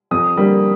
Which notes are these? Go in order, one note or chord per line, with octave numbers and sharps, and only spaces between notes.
F2 D#6
D3 G3 A#3